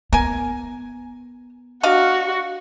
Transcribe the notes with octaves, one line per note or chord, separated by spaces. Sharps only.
B3 A#4 G#5
D4 F#4 D#5 F5